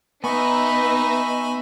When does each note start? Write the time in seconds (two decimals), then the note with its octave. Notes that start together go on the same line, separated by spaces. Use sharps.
0.24 B3 D#4 B4 D#5 E5 G#5 B5 C#6